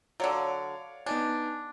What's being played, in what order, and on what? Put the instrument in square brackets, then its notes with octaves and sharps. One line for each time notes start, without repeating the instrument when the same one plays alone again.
[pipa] D3 F#3 [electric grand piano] C#5 D5 F5
[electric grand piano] B3 D#4 G#5 [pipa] D4